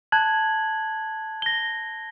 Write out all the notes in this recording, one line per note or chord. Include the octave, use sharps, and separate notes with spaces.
A5 F#6 G#6 F#7
A#6 G7